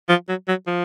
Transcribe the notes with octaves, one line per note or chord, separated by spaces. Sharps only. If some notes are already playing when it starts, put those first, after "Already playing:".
F3
F#3
F#3
F3